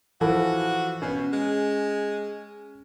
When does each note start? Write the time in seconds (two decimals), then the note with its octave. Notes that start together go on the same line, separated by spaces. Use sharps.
0.21 E3 F3 F#4 A4
1.02 B2 C#4
1.33 G#3